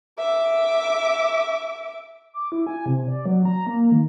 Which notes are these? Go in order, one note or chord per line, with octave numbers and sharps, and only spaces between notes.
E5 D6
D6
E4
G#5
C3
D5
F#3
A#5
A#3
D#3